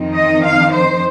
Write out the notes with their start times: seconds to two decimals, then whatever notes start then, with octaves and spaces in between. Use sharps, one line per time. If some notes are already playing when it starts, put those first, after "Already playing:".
Already playing: F2 D#3 C4 D#4
0.14 D#5
0.44 F5
0.72 C5